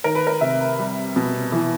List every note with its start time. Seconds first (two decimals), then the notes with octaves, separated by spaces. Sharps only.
0.04 D#3 A#4
0.15 B4
0.27 A#4
0.41 C3 E5
0.79 G3
1.16 B2
1.52 E3